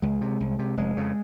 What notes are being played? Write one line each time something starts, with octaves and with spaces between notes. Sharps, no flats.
C#2 G#3
C3
C2
C3
F1 G#3
F2 C#3